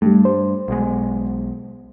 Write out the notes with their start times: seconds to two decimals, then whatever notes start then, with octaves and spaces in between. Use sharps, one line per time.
0.02 G2 G3 A3
0.25 C5
0.68 B1 B2 G#3